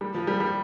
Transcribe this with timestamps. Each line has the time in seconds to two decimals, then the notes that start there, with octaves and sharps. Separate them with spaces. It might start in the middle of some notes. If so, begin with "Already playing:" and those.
0.01 G3
0.14 F3
0.27 G3
0.40 G3